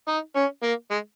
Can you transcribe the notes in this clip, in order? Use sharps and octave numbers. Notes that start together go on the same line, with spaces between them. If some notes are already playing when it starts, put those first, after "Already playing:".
D#4
C#4
A#3
G#3